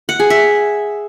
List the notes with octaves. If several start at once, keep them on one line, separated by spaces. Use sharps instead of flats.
F#5
G#4
E5